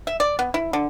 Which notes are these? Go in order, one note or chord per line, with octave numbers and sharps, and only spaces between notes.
E5
D5
B3
E4
D3